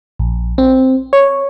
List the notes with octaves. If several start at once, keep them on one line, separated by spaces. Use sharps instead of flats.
A#1
C4
C#5